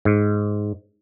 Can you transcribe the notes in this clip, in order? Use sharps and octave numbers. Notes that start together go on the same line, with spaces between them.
G#2